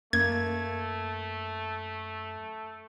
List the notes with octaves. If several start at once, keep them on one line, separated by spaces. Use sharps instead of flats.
F#2 A3 A#3 G#6